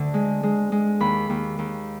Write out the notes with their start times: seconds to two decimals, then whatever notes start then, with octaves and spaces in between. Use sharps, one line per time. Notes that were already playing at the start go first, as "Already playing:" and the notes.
Already playing: D2 D3
0.14 G#3
0.43 G#3
0.72 G#3
1.00 D#2 B5
1.30 D#2
1.59 D#2